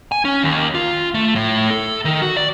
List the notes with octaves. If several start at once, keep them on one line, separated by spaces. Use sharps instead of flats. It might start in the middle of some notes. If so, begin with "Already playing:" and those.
G#5
C#4
D#2
F4
A3
A2
A4
D#3
F#4
D5